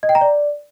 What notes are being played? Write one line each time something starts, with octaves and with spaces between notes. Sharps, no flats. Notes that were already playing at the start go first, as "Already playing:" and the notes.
D#5
G5
A#5
D5